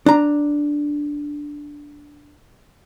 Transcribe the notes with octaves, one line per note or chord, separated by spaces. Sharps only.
D4 A#5